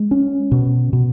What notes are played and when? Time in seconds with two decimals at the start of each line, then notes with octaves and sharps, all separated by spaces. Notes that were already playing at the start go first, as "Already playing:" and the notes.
Already playing: G#3
0.11 C#4
0.51 B2
0.93 B2